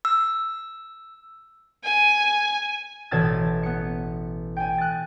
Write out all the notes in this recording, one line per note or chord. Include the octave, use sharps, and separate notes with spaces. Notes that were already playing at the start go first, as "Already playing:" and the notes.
E6
G#5
A1 B2 E5 A5 G#6 A6
B3 C#7
G5 G#5
F#6 A6